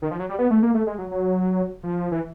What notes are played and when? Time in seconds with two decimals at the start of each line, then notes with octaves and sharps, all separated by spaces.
0.02 D#3
0.11 F3
0.19 F#3
0.29 G3
0.39 B3
0.51 A3
0.62 A#3
0.74 A3
0.87 G#3
0.98 F#3
1.11 F#3
1.83 F3
2.12 E3